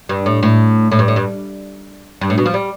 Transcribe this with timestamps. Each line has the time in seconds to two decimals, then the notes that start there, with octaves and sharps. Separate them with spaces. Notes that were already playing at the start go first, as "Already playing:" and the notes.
0.09 G2
0.26 A2
0.43 A2
0.92 A2
0.99 G2
1.08 A2
1.16 G2
2.21 G2
2.30 A2
2.38 B2
2.46 F3
2.54 G3